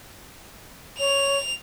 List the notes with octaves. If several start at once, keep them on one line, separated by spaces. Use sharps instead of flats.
C#5 F7